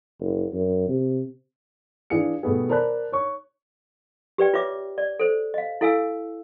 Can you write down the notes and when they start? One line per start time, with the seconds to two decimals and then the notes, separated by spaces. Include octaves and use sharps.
0.20 F#1
0.53 F#2
0.88 C3
2.10 E3 D4 G#4 F5 C#7
2.43 B2 G3 A3 B3 G#4
2.69 A#4 C5 D5 A5 B5 F#6
3.12 C#5 C#6
4.38 G4 B4 D5 G5
4.53 F4 B4 C#5 E5 D6
4.98 D5
5.20 A4 C5
5.54 D#5 F5
5.81 E4 A4 F5 G#5 E6